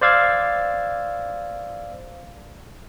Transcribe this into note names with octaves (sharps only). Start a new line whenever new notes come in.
C5 D5 F5 E6 G#6